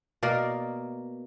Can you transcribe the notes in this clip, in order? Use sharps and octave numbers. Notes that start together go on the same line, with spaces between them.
B2 A#3 A#4 D5